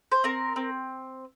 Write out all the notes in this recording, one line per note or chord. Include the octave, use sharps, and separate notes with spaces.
C5
C4 A#4
C4